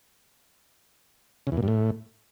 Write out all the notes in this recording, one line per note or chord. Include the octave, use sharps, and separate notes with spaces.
C#3
E2
A#2
G2
A2